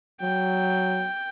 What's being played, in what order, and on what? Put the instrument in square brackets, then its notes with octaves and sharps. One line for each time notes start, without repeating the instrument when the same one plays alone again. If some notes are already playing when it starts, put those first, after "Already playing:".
[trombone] F#3 [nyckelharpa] G5